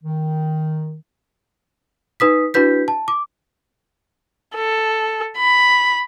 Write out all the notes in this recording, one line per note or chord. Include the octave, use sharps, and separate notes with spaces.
D#3
D#4 B4 D#6 B6
D4 E4 F#4 B4 G6 B6
A5
D6
A4
B5